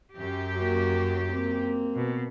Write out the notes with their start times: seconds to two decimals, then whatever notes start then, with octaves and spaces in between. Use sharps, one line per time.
0.14 F#2 G4
0.55 A#3 F#4
1.32 A#3 C4
1.95 B2